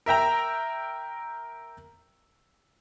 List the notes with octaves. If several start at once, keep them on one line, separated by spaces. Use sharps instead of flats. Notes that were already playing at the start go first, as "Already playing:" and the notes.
A#4 E5 G5 A#5